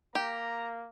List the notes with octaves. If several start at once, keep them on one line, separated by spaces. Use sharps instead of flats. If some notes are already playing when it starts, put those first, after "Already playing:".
A#3 G4 A#5